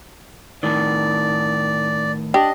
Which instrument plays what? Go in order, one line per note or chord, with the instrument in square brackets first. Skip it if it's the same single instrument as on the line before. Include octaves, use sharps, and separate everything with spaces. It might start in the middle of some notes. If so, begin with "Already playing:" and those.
[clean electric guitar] A2 D#3 [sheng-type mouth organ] D5
[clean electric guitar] D4 [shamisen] G4 [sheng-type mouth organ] D#5